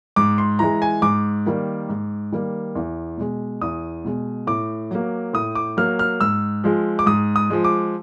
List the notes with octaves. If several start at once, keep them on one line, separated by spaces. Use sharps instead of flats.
G#2 D6
C6
E3 G#3 A#5
G#5
G#2 D6
D#3 G3 A#3
G#2
D#3 G3 A#3
E2
B2 G#3
E2 D#6
B2 G#3
A2 D6
F#3 A#3
A2 D#6
D6
F#3 A#3 F6
F6
G#2 E6
F3 G#3
D6
G#2 D#6
D#6
F3 G#3
D6